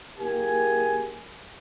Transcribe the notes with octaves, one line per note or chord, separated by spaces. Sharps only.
F#1 A#3 G4 G#4 G#5